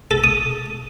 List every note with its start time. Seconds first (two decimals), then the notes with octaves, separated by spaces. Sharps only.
0.11 A4
0.24 D#6